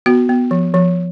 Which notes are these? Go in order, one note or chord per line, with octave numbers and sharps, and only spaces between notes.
B3 F#4
B3
F3
F3